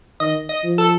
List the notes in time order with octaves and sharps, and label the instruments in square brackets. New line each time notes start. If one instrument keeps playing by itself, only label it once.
[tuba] D#3 [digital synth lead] D#5
[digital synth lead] D#5
[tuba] F3
[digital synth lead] A4